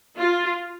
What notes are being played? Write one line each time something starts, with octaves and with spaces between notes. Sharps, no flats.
F4